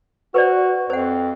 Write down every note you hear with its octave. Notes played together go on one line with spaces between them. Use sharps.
F#4 B4 C5 D5
F2 C5 F#5